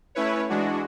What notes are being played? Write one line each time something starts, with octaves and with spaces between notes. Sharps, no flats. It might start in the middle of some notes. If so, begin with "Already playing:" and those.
A3 C#4 E4 B4 C#5
E3 G#3 D4 F#4